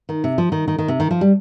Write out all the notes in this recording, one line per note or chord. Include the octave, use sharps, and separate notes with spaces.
D#3
C3
F3
D#3
D#3
D#3
C3
D#3
F3
G3